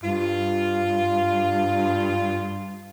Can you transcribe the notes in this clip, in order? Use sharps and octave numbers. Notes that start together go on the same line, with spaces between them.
G2 F4